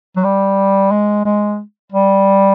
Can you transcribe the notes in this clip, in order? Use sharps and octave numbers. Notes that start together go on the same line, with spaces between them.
F#3
G3
G#3
G#3
G3